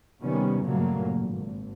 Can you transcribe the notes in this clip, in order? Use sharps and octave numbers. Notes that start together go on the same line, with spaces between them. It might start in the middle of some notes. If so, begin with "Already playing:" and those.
C3 D#3 G3 B3 C#4
G2 A#2 C#3 F#3 A3 A#3
G#1